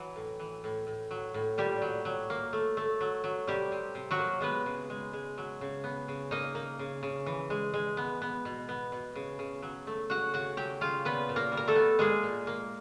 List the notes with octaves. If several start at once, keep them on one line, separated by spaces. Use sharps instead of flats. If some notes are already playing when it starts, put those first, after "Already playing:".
Already playing: E3 F#3
A2
E3
A2
A2
F#3
A2
A#2 G3 G4
F#3
F#3
A#3
A3
A3
F#3
F#3
C3 G3 G4
C3
C3
F#3 F#4
A#3
G#3 B3 B4
C#3
G#3
G#3
F#3
C#3
B3
C#3
A#3 D#4 D#5
A#3
C#3
C#3
E3
G#3
G#3
B3
B3
B2
B3
B2
C#3
C#3
F#3
A3
C#3 F#4 F#5
C#3 F#4 F#5
F#3 G4 G5
C#3 F4 F5
A#2 B3 B4
A#2
A#3 A#4
G3
A#4
A3 A4
B3
G#3 A#3 G#4
A#2
A#3